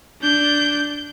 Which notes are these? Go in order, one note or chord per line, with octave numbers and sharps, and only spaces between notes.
D4 G6